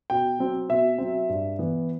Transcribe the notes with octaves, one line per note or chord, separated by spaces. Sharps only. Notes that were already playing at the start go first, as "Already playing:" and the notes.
B2 G5
F#3 C4
B2 E5
F#3 C4
G2
E3 B3